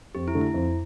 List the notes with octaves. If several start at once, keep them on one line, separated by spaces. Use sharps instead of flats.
F2 G4
E4
D3 A3
E4
F2